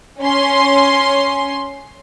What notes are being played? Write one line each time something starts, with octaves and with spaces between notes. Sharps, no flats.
C#4 C6